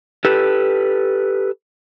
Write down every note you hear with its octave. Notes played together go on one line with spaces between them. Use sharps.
G4 A4 B4